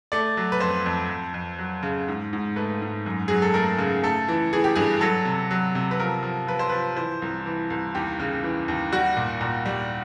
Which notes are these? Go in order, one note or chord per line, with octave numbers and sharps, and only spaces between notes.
A3 D5
F#3
B4
F2 C5
F2
F2
F2
F#3
C#3
G#2
G#2
A3 B4
G#2
F#2
F#3 G#4
A4
A3 A#4
C#3
A3 A4
E3
E3 G#4
G4
G2 G#4
F#3 A4
C3
F#3
C3
B4
F3 A#4
F3
F3 B4
C5
F3 B4
E3 C5
C2
E3
C2
D#2 G4
C#3
E3
D#2
G3 F#4
A#2
A#2
G3